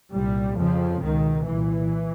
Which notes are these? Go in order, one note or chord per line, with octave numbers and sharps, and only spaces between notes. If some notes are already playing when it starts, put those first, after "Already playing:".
C2 A#2 G3
F2 C#3 F3
C#2 B2 D#3
C2 A#2 E3